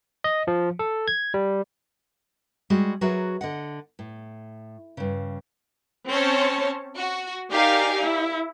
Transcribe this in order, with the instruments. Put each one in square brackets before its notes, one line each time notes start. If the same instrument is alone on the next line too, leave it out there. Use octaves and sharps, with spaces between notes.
[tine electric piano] D#5
F3
A4
G#6
G3
[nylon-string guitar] G3 G#3 F#4 G#4
F#3 F#4 G#4 A#4 B4 E5
D3 D#5 F#5
A2
G2 C#3
[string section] C4 C#4 C5 C#5 A5
F#4
D#4 G4 A#4 D5 F5 G#5
E4